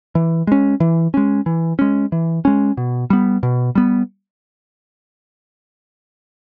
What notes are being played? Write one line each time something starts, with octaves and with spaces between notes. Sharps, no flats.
E3
G#3 C#4
E3
G#3 C#4
E3
G#3 C#4
E3
G#3 C#4
B2
G3 B3
B2
G3 B3